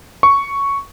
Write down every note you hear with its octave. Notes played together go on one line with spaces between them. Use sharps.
C#6